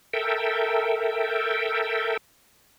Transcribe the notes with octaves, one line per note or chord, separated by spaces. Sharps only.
A4 A#4 E5 G5